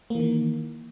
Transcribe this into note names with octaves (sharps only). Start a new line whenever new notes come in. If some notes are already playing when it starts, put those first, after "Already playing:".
D#3 E3 A#3